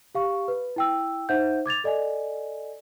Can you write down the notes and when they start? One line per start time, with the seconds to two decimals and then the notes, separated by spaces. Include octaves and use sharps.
0.15 G4 F5 C#6
0.48 B4
0.76 E4 G5 E6
1.29 D#4 C5 E5 F#5 G6
1.66 D6 G#6 A6 F7
1.84 A4 D5 D#5 G#5